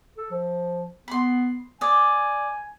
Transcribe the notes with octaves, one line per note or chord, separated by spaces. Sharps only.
A4
F3
B3 B5 C6
D5 G#5 D#6